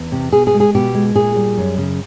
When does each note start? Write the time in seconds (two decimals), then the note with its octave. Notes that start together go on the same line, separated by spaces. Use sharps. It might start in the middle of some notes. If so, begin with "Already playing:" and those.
Already playing: E2
0.12 C3
0.32 B2 G#4
0.47 G#4
0.54 G#3
0.60 G#4
0.75 B2 G4
0.94 G#3
1.15 A#2 G#4
1.36 G3
1.58 F#2
1.78 C#3